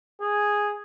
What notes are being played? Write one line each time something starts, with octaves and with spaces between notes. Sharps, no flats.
G#4